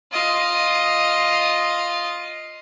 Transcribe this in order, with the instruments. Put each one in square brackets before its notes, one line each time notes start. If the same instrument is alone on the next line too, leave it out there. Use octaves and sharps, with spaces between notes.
[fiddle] F4 D#5